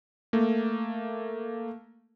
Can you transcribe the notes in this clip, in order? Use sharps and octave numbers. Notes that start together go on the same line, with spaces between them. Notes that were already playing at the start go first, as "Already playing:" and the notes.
A3 A#3